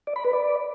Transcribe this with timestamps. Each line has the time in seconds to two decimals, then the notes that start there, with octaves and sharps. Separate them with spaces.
0.07 D5
0.16 B5
0.25 B4
0.33 D5